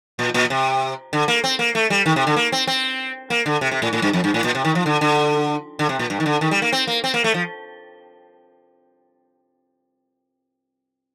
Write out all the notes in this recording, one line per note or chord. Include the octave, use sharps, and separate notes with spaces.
A#2
A#2
C3
D3
A#3
C4
A#3
A3
G3
D#3
C3
D3
A#3
C4
C4
A#3
D3
C3
C3
A2
A2
G2
F2
G2
A2
A#2
C3
D#3
F3
D3
D3
D3
C3
A#2
G2
D#3
D3
D#3
G3
A#3
C4
A#3
C4
A#3
A3
F3